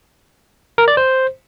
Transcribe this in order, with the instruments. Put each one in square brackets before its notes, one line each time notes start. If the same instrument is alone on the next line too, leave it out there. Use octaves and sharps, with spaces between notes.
[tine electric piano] A#4
D5
C5